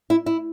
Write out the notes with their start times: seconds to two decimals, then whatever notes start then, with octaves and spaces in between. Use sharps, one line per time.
0.10 E4
0.26 E4